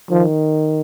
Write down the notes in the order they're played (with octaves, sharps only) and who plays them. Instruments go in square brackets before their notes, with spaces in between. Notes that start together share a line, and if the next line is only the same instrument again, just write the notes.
[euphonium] D#3 [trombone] F3